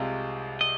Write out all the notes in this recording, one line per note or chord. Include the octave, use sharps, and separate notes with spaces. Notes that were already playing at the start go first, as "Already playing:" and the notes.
Already playing: C2 C3 G#3 C4 F4
D#5